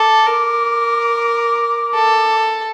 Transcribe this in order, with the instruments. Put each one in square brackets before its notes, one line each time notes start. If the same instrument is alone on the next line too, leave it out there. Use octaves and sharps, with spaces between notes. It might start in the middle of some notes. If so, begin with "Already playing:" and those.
Already playing: [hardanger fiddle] A4 [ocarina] D6
[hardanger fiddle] A#4
A4